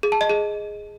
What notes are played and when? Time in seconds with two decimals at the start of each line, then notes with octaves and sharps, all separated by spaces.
0.03 G#4
0.12 A5
0.21 D#5
0.30 G#4